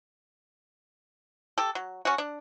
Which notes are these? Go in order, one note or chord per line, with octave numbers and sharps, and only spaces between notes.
G4 A4
F#3
C#4 F#4
D4